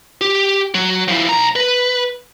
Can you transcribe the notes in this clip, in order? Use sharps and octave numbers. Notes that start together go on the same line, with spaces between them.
G4
F#3
F3 E4
B1 A#5
B4